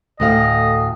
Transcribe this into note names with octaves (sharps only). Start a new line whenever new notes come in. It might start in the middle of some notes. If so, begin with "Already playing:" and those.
D2 A2 D#5 F5